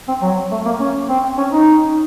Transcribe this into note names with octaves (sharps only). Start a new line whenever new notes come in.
C4
F#3
A3
A#3
C#4
C4
C#4
D#4